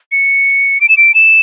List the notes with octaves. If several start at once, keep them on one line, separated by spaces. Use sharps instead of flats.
C#7
D7
E7
D7
E7